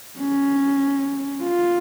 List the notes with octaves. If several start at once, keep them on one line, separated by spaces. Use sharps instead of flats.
C#4
F4